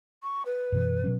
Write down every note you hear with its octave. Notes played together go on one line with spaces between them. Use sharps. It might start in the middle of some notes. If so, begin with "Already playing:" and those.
C#6
B4
F#2 B2 E3
B2 F#3 C#4